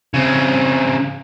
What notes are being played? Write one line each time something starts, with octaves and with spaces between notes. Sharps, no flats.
C#3 C4